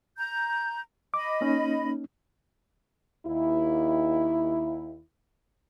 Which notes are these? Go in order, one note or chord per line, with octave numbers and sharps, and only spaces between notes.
A#5 G6
D#5 B5 D6
A#3 C#4 D#4
D#2 E4